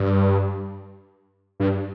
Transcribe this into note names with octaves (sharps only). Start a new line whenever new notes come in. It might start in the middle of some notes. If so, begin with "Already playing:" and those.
Already playing: G2
G2